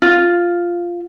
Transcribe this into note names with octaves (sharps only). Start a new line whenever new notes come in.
F4